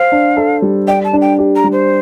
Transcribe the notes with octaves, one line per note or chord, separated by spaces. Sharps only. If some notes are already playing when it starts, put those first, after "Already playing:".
Already playing: C5 F5
D4
A4
G3
D5 G5
A5
D4
G5
G4
A#5
G3
C5